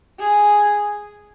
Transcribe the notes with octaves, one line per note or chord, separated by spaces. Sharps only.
G#4